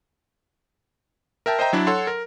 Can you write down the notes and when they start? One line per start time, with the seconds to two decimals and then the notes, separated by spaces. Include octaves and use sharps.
1.46 A#4 E5 G5 A5
1.59 C5 D#5 E5 G5 A#5
1.73 F#3 D4 E4 D5
1.87 A4 C#5 F#5 C6
2.07 A#4